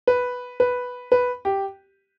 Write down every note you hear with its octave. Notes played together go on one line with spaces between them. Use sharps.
B4
B4
B4
G4